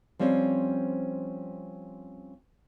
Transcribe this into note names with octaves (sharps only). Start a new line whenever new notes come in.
F3 G3 C4 C#4